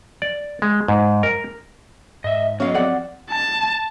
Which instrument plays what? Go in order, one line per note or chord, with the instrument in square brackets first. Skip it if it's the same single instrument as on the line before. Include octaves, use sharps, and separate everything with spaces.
[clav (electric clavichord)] D5
G#3
G#2
A#4
[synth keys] G#2 [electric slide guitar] D#5 E5
[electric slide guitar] F#3 B3 D#5 [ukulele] C#4 F5 [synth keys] C#5
[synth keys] F3 C4 [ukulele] D5 F#5
[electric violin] A5